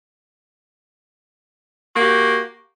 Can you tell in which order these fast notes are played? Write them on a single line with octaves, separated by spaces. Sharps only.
F#4 A#3 G4